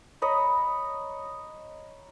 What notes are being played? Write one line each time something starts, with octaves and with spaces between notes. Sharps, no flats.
C#5 D#5 A#5 B5